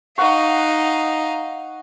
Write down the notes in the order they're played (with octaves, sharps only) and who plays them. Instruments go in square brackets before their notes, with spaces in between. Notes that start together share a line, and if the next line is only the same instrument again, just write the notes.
[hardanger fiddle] D#4 F5 [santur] F#5 C#6